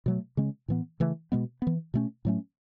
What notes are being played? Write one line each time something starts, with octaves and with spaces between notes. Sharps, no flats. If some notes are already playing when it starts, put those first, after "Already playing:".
B2 F#3 A3
C#3 G#3 C#4
A2 E3 B3
C#3 E3 A3
B2 G#3 B3
E3 B3
B2 A3 C#4
A2 F#3 A3 C#4